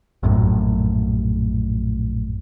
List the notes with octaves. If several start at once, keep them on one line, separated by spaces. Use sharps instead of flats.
A#1 F#2 A2